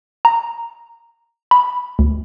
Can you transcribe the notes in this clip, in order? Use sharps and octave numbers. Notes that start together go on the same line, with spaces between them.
A#5
B5
D2